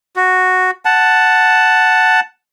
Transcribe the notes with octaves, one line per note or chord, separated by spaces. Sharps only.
F#4
F#5 A5